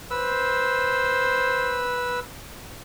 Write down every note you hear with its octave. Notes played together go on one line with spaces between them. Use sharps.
B4 C5 E6